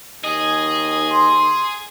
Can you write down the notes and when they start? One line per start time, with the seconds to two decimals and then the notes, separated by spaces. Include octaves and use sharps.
0.24 D#2 G#4 D#5
1.10 C6